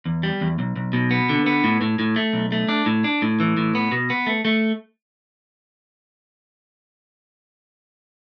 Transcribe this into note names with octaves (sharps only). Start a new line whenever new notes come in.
E2
G3
E2
B1
B1
B2
B3
D3
B3
A2
A2
A2
A3
B1
A3
D4
A2
D4
A2
E3
A2
B3
B2
B3
A3
A3